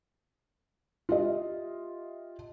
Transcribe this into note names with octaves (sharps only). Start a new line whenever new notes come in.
F4 G4 D#5 E5